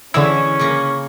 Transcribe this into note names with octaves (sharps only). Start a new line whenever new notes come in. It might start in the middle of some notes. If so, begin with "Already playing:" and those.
D3 E3 G#3 C#4 E4
C#3 A#3